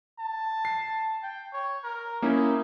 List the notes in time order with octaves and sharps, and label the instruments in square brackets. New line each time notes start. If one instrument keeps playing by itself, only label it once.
[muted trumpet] A5
[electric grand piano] C7
[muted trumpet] G5
C#5
A#4
[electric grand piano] A#3 C#4 E4 [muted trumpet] D#4